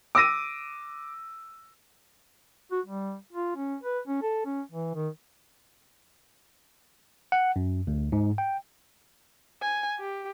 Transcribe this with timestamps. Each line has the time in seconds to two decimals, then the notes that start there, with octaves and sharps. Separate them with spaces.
0.15 D6 E6 A#6 D#7
2.71 F#4
2.86 G3
3.33 F4
3.56 C#4
3.83 B4
4.08 C#4
4.22 A4
4.45 C#4
4.71 E3
4.95 D#3
7.32 F#5
7.56 F#2
7.87 D2
8.12 G#2
8.38 G5
9.61 G#5
9.99 G4